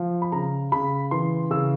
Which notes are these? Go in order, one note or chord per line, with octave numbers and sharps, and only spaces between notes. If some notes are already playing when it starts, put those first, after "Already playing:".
Already playing: F3
B5
C#3 A#5
C#3 B5
E3 C6
C#3 E6